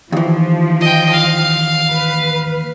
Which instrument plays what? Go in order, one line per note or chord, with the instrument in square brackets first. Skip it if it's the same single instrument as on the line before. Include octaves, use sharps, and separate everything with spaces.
[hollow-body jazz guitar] D#2 E3 [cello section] F3
[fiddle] D#5 G5
F5
[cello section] B4